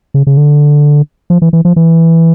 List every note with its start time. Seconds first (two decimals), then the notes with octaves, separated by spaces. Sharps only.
0.14 C#3
0.27 C#3
0.37 D3
1.30 F3
1.42 E3
1.53 E3
1.65 F3
1.76 E3